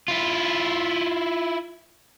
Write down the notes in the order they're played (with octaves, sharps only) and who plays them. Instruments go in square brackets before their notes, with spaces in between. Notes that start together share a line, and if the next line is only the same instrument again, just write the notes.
[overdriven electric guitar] E4 F4